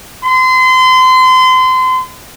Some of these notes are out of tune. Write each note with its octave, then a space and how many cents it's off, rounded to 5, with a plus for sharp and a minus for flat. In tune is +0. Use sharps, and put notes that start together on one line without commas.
C6 -30